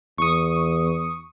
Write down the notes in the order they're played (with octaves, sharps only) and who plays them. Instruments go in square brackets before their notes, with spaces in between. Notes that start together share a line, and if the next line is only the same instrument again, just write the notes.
[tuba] E2 [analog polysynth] C#6 D#6